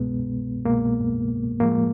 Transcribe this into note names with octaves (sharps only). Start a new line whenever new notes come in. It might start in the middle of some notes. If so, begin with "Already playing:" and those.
Already playing: C2 B2 G#3 B3
C2 B2 G#3 A#3
A2 F3 G#3 A#3